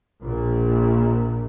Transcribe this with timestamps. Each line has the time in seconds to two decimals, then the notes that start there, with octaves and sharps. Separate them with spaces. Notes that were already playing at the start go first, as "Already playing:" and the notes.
0.20 A#1 A#2